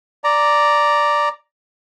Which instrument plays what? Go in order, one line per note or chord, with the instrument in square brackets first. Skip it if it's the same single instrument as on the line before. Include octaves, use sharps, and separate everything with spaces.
[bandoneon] D5 A#5